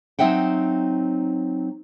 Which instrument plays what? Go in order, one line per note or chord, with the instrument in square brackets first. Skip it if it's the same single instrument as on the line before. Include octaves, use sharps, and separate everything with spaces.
[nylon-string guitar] F#3 C4 D#4 E5 F#5 G5